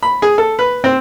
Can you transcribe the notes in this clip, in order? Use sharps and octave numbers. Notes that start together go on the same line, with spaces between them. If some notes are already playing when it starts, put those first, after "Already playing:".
B5
G#4
A4
B4
C4